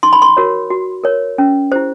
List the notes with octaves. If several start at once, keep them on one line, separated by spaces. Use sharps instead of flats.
D#4 C6
B5
C6
F#4 A#4 C#5
F#4
A#4 C#5
C#4
E4 G4 C5